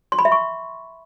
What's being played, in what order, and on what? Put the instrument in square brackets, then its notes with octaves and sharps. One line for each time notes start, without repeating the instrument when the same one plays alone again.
[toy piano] C6
B5
E5
C#6